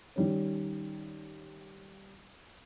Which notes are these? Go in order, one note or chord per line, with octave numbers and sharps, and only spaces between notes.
D#3 G3 C#4